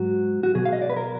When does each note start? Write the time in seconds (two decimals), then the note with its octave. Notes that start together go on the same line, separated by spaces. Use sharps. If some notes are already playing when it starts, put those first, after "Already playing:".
Already playing: G#2 F#3 F#4
0.43 F#4
0.55 B2 F#3 G#4
0.65 F5
0.73 D#5
0.82 D5
0.90 B4
0.96 A#4